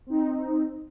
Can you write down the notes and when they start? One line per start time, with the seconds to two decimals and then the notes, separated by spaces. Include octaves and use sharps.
0.06 C4 D#4